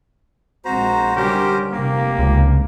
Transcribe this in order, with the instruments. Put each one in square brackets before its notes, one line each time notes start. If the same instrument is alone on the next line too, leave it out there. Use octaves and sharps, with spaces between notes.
[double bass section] A#1 G#3 C4 [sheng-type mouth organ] F#4 C5 [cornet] A#5
[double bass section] D3 G3 [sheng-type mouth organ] C#4 A#4 C5 [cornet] G4
[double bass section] F1 C3 [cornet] A#3 [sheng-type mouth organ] G4
[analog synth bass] C#2